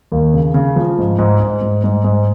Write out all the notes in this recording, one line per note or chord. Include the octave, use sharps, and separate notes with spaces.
D#2
C#3
C#3
F3
G#2
G#2
G#2
G#2
G#2
G#2